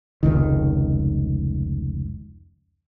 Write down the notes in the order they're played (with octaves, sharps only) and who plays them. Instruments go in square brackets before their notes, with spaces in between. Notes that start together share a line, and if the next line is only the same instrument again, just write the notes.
[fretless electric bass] F1 C#2 D#3